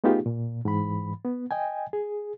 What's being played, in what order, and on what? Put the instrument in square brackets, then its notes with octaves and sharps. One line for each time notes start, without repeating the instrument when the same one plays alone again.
[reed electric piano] A3 B3 D#4 F4 G4 G#4
A#2
G#2 E3 B5
B3
D#5 G5 G#5
G#4